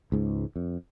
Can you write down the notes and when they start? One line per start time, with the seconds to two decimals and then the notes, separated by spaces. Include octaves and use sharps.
0.12 C#2 G#2
0.56 F2